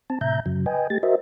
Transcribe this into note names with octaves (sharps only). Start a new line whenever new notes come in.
C4 A5
A2 C3 E5 A#5 G6
F#2 C#3 F#3
B4 D#5 G5 G#5
A3 G4 A6
F#4 A#4 C5 D#5 E5